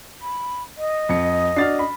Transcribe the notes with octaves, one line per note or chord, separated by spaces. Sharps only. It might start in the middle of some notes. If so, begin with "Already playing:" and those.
B5
D#5
F2 C#7
D4 F#4 F6 A6 C7
B5